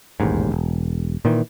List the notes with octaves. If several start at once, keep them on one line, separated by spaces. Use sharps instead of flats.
E1 A1 D#2 G#2
E1
A#2 D#3 E3